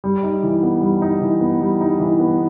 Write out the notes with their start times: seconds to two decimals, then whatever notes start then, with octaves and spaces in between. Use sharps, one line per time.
0.04 G3
0.23 D#4
0.43 E3
0.63 B3
0.81 G3
1.02 D#4
1.21 E3
1.41 B3
1.61 G3
1.81 D#4
2.00 E3
2.20 B3